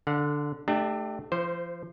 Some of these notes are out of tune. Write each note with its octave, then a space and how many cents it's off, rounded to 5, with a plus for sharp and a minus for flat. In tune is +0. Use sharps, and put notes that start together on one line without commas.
D3 +0 F#5 -40
A3 -10 D4 +30 G4 +0
F3 -35 C5 +0